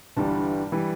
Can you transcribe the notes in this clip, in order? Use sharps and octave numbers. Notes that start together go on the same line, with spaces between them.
G1 G2 E3 G3 A5
E3 G3